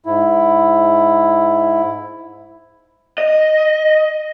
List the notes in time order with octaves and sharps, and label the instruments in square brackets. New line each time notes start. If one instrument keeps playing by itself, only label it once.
[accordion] G#2 E4
[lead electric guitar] D#5